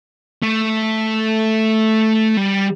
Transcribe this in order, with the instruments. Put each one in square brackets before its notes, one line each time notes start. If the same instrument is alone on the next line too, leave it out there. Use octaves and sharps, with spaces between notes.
[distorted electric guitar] A3
G3